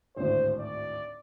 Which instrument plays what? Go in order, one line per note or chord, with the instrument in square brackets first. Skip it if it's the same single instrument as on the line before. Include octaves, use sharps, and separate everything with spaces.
[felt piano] G#1 D2 A2 [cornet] C5
[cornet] D5